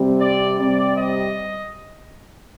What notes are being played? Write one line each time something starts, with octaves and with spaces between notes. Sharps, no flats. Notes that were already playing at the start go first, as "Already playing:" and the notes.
Already playing: C3 G3
D5
C3 G3 D5
D#5